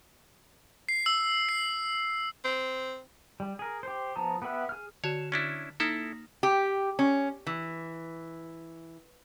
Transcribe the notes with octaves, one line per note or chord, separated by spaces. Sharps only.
C7
E6
C7
C4
G3
G#4 A#4
G4 C5
F3 B3 A5 A#5 D#6
B3 G4 B4 E5 F#5
G#4 F6
D3 F#4 C#5 E7
C#4 D4 E4
A#3 D#4 E4 A4 A#6
G4
C#4
E3